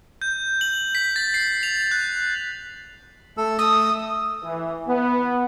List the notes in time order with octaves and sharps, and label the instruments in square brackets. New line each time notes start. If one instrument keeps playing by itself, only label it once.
[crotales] G6
F#7
B6
A6
C7
F7
F#6
[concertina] A3 A4 E6
[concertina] A3 E6 [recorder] D#6
[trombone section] E3
B3